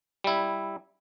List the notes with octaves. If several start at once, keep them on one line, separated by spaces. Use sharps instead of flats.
G3 E4